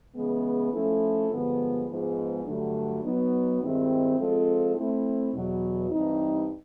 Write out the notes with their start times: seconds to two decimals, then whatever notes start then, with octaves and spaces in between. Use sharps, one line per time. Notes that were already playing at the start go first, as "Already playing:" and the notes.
0.16 C#3 E3 G#3 B3
0.72 F3 A3 C#4 E4 A4
1.30 G2 D3 F3 G#3 B3
1.88 G#2 F3 G#3 B3
2.45 G2 D3 F#3 A3 D4
3.03 F#3 B3 D#4
3.61 G2 D#3 G#3 C4 E4
4.18 F3 G#3 C4 F4 A4
4.75 A3 C4 E4
5.34 E2 B2 F#3
5.90 G2 E3 G3 C4 D#4